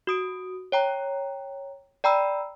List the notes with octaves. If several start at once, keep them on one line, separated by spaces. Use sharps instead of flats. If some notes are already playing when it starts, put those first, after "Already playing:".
F#4 D#6 D7
C#5 G5 A#5
D5 G5 A#5 B5 E6